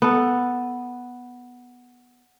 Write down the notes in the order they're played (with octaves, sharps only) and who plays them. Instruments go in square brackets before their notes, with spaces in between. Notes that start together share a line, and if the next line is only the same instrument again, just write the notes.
[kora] B3 A4